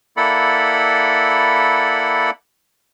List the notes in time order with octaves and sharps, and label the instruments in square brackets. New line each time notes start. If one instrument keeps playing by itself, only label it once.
[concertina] A#3 E4 A4 D5 F#5 B5